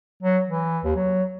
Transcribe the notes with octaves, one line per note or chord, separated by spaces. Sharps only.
F#3
E3
D#2
F#3